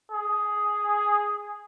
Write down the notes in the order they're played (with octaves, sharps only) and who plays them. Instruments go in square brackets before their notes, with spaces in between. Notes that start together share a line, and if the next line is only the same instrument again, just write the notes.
[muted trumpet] G#4